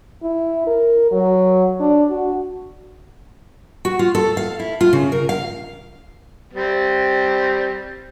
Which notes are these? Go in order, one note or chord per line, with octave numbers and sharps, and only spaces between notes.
E4
A#4
F#3
D4
F#4
F#4
F4
A4
F5
E4
F4
C#3
A#4
F5
G3 C4